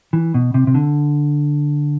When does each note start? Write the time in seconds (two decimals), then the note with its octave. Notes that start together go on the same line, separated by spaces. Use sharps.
0.13 E3
0.34 B2
0.54 C3
0.67 C3
0.74 D3